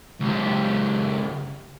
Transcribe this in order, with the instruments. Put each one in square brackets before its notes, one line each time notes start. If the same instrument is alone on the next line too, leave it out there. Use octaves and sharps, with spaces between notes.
[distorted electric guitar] C#2 G4